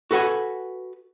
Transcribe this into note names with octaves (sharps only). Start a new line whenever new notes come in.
F#4 A4 B4 F#5 G#5